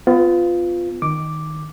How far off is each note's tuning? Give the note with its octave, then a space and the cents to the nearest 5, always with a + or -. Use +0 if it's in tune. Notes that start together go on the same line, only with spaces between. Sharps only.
B3 +35 F4 +0
D#3 +0 D6 +0